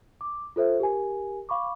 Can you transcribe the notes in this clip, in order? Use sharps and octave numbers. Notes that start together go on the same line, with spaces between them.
D6
F4 A4 C5 E5
G4 A#4 G#5
F5 B5 C#6 D6